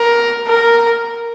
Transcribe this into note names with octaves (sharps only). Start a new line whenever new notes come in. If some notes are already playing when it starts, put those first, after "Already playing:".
Already playing: A#4
A#4